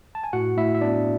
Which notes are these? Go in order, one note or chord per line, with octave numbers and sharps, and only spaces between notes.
A5
G#5
A2 F#4 F#5
A2 E4 E5
E5
B3 D4 D5